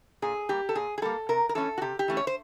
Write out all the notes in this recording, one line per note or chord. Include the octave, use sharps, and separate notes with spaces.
A#2 G#4
G3 A#3 G4
A4
A#2 G#4
G#4
G3 A#3 A4
C3 A#4
A#4
E3 A3 C#4 A4
F#4
C3 G4
G4
E3 A3 C#4
C#5
C5